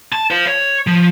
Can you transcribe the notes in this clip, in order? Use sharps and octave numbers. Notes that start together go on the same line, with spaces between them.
A5
C5 F5
C#5
F3